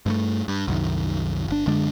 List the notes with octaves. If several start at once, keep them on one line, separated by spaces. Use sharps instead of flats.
G2 G#3 A3
G2
C2 F#2 D#3
G1 D4
F#2 D3 G#3 D4